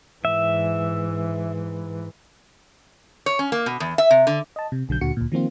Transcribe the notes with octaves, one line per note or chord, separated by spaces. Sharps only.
G#2 E3 E5
C#5
C#4
A#3
B2
E2
E5
C3
D3
D#5 A5
C3
B1 D3 F#3 G6
D2 A#2 D3 F#4 C#7
D2 A#2
D#3 F3 A#3 C4 F4